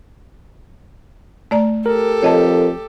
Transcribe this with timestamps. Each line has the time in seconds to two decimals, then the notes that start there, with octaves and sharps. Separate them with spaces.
1.51 A3 D5 A#5
1.86 G4 A4 A#4
2.22 F2 C#5 D#5 A5